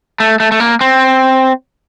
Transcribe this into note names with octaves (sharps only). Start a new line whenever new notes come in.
A3
A3
A3
A#3
C4